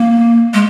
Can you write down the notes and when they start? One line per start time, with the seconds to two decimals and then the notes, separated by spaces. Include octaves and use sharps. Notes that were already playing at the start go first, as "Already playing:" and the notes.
Already playing: A#3
0.54 G#3